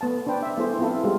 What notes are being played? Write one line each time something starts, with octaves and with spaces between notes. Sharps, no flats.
A3 B3 F#5 A5
D4 B4 C5 G5
D4 E5
G3 A3 B3 E4 G#4 C5
B3 C4 E4 F4 A4 B4
G3 G#3 B3 F4 G4